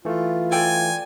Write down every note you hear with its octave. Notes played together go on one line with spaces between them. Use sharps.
E3 A3 F4
A4 D5 G5 G#5